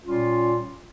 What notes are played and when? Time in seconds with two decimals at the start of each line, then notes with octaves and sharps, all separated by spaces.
0.05 A#2 G3 C#4 F4